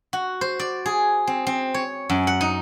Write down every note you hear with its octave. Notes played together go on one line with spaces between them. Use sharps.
F#4
C5
D5
G#4
C4
C4
C#5
F#2
F#5
D#4